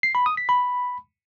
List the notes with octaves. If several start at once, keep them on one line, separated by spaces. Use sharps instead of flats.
C7
B5
D#6
B6
B5